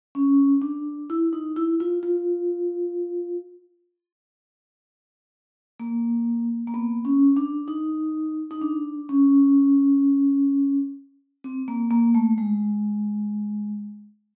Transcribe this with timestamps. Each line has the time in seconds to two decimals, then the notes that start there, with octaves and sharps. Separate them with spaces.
0.15 C#4
0.62 D4
1.10 E4
1.33 D#4
1.56 E4
1.80 F4
2.03 F4
5.80 A#3
6.67 A#3
6.74 B3
7.05 C#4
7.37 D4
7.68 D#4
8.51 D#4
8.62 D4
9.09 C#4
11.44 C4
11.68 A#3
11.91 A#3
12.15 A3
12.38 G#3